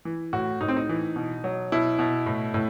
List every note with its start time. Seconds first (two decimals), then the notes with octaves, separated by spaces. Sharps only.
0.05 E3
0.33 A2 F#4
0.61 A2 D#4
0.68 C4
0.76 D#4
0.89 E3
1.16 B2
1.44 F#3
1.72 B2 E4
1.99 B2
2.26 A2
2.54 A2